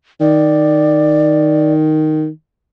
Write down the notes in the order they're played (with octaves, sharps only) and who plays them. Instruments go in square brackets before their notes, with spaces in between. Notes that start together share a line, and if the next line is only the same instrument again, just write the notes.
[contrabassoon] D#3 [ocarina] D5